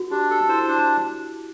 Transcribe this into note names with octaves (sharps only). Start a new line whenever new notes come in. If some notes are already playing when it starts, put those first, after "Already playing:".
Already playing: F#4
D4 G4
G4 A4
E4 C5
D4